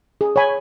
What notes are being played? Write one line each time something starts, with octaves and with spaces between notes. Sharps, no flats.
G#4
C#5 G#5 B5